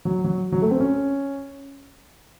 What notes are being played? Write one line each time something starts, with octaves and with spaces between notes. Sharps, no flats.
F#3
F#3
F#3
A3
C4
C#4